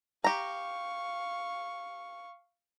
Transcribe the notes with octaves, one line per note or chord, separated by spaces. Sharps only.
G4 F5 A#5 C#6